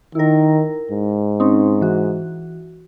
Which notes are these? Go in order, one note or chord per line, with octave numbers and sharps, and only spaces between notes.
D#3 E4 A#4
G#2
C4 C#4 D#4
E3 F#4